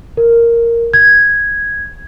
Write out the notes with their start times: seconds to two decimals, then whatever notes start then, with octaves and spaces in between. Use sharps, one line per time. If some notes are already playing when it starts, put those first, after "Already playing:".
0.17 A#4
0.94 G#6